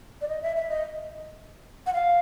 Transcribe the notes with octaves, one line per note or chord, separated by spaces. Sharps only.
D5
D#5
E5
E5
D#5
F#5
F5